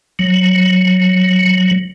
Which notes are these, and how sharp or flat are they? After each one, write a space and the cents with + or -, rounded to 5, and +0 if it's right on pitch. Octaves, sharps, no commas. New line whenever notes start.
F#3 -5